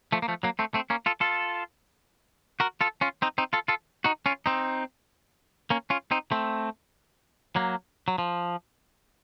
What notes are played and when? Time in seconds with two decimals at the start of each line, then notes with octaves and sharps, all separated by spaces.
0.12 F3 A3
0.22 A#3
0.28 F3 A3
0.43 F#3 A#3
0.59 A3 C4
0.74 A3 C4
0.90 A#3 C#4
1.06 F4 A4
1.21 F4 A4
2.60 F#4 A#4
2.81 F4 A4
3.01 C#4 F4
3.22 C4 D#4
3.38 C4 D#4
3.53 F4 A4
3.68 F4 A4
4.04 D#4 F#4
4.26 C#4 F4
4.46 C4 D#4
5.70 A#3 C#4
5.90 C#4 F4
6.11 C4 D#4
6.32 A3 C4
7.56 F#3 A#3
8.08 F#3
8.18 F3